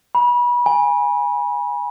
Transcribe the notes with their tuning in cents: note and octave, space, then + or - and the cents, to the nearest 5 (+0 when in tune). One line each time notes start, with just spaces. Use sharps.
B5 -30
G#5 -15